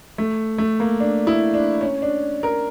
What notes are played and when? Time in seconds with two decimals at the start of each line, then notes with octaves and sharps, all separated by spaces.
0.18 A3
0.58 A3
0.80 A#3
1.00 D4
1.27 E4
1.54 D4
1.81 C#4
2.02 D4
2.43 A#4